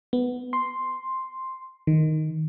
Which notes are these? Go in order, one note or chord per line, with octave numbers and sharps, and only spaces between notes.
B3
C6
D#3